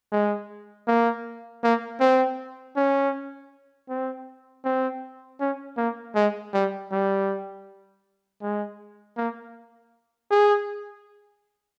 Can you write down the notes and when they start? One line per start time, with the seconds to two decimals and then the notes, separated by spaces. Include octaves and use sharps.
0.12 G#3
0.87 A#3
1.64 A#3
2.01 C4
2.76 C#4
3.89 C4
4.65 C4
5.41 C#4
5.78 A#3
6.16 G#3
6.54 G3
6.92 G3
8.42 G#3
9.17 A#3
10.31 G#4